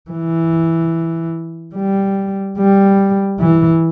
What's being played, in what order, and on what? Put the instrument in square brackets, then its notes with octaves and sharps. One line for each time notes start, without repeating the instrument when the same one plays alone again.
[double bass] E3
G3
G3
E3